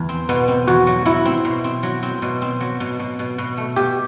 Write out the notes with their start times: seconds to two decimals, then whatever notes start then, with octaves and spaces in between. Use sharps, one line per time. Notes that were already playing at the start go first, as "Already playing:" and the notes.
Already playing: E2
0.09 C4
0.29 B2 B3
0.48 C4
0.68 E2 F#4
0.87 F#3
1.06 F#3 E4
1.25 C4
1.45 B2
1.64 C4
1.83 F#3
2.03 C4
2.22 B2
2.42 C4
2.61 F#3
2.80 B2
2.99 B2
3.19 B2
3.38 B2
3.57 A3
3.76 B2 G4